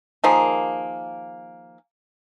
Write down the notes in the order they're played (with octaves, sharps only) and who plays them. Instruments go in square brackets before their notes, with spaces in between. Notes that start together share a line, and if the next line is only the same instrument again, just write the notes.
[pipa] D#3 F3 A#3 G#4